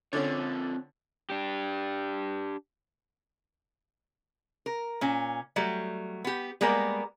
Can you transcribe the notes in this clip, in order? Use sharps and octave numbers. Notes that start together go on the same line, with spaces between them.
D3 C4 C#4 F4 C#5
D4 G4
A#4
A#2 C#4
F#3 G3 A3
B3 G4
G3 G#3 A#3 B3 A#4 D5